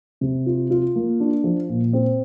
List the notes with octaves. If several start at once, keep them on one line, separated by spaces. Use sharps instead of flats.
C3
F4
F4
A#3
D4
F3
A#2
C4